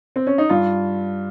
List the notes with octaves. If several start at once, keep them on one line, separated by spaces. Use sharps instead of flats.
C4
C#4
D#4
G2 F4